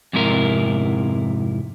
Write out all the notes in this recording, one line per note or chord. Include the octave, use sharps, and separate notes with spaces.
F2 G#2 C3 E4 A#4